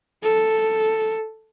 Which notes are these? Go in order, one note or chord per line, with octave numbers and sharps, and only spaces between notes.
A4